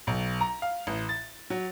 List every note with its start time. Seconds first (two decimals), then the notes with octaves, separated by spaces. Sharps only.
0.07 B1
0.41 A#5
0.62 F5
0.87 A1
1.09 A6
1.50 F#3